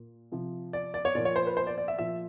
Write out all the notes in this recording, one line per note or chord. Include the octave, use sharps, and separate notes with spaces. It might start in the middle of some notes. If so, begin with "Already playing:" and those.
Already playing: A#2
C3 F3
D5
D5
C#5
A#2 F3 D5
C#5
C5
B4
C5
D5
D5
E5
A#2 F3 E5